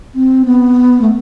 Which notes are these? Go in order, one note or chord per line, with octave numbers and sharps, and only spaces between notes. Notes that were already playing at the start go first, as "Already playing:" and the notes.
C4
B3
A3